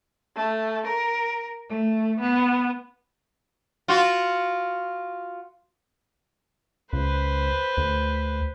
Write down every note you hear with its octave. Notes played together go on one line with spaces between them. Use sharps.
A3
A#4
A3
B3
F4 F#4
C#2 B4 C5
D2